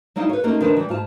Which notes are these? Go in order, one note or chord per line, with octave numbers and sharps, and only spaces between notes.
F#3 G3 D#4 E4 F5
B4 C#5
A3 A#3 C#4 D#4 F4 G4
D#3 F3 D4 A#4 B4
E3 G3
G#2 F4 A5